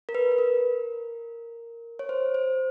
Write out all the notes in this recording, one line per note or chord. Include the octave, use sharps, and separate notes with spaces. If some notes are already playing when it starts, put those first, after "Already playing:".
A#4
B4
B4
A#4
C#5
C5
C5